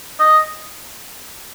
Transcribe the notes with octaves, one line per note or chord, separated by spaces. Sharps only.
D#5